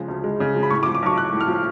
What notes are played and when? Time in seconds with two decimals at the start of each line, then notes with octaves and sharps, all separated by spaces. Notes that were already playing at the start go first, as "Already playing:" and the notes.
Already playing: C#3 F3 G#3
0.08 D2
0.24 G#3
0.40 C#3
0.56 F3
0.63 B5
0.70 A2 C#6
0.83 D6
0.86 F3
0.95 D6
1.02 B1 C#6
1.17 B1 F#6
1.33 A2
1.40 F6
1.48 F3